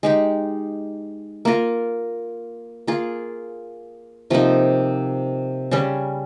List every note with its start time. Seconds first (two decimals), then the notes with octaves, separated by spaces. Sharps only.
0.03 G#3 D#4 G4
1.45 A#3 F4 A#4
2.87 A#3 F4 G#4
4.30 C3 F3 A#3 D#4
5.71 C#3 G3 C#4